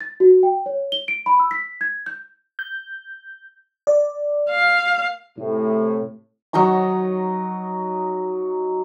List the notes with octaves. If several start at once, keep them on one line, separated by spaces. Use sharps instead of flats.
A6
F#4
G5
C#5
G7
D7
B5
E6
B6
G#6
G6
G6
D5
F5
A2 C3
F#3 D#4 A#5 C#6